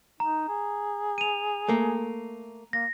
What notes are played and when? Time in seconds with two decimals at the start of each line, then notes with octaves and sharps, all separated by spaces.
0.20 D#4 A#5
0.49 G#4
1.18 D#7 F7
1.69 A3 A#3
2.73 A#3 A#6